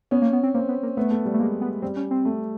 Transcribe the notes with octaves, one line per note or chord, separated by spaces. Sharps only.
B3 C#4
A#3
B3
C4
A#3 C4
B3
A#3
A3 B3
A3
G3
A3
G#3 A#3
B3
G3 C4
C#4
C4
A3